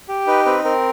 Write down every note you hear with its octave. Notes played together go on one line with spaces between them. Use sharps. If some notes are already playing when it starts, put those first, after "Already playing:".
G4
D#4 B4
C4 B4
C4 A#4